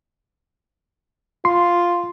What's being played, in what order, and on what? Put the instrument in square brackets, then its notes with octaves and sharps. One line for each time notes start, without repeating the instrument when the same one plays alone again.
[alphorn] F4 [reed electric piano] C6